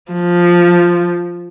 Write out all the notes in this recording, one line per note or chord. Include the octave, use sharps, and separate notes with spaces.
F3